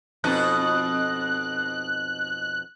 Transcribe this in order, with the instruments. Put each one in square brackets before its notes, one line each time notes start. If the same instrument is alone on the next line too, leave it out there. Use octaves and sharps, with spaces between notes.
[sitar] F2 B2 D#4 [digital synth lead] F#6